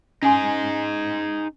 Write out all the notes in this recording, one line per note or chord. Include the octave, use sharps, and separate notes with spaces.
C#4 D#4 G#4 G#5 C6